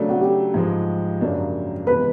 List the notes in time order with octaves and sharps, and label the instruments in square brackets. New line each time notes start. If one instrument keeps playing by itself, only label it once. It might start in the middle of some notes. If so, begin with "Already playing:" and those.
Already playing: [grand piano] C#3 F#3 A3 D4
[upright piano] F#4
G4
[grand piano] G#2 F3 G#3
F#2 C#3 F#3 A#3 D4
[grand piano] C3 E3 G#3 B3 [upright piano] B4